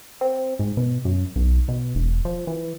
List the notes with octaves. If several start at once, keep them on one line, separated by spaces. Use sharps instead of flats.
C4
G#2
B2
F#2
B1
B2
E1
F3
E3